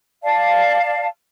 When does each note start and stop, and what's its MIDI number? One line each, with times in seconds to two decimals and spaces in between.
0.23 1.07 74
0.23 1.07 77
0.23 1.07 81